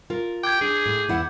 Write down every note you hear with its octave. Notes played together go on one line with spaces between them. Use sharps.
F4 A#4
G5 D6 G6 G#6
D4 G#4
A2
E2 E4 F#5